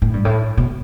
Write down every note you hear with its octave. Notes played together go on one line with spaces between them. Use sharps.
A2
G2
A2
B2